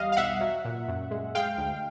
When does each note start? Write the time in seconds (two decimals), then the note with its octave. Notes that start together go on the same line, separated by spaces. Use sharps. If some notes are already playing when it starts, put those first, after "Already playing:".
Already playing: E2 G3 D#5 F5
0.12 F5
0.17 B1 E5 F#5
0.41 F#3
0.65 A#2
0.88 F#2
1.11 G#3
1.35 G#3 F5 G5
1.58 D2